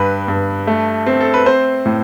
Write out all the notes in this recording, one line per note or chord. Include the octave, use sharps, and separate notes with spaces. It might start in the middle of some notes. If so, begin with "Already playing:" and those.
Already playing: G2 B4
G2
A3
C4
A4
B4
C4 C5
A2